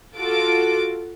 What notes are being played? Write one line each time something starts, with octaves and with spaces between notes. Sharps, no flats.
F4 F#4 A4 D6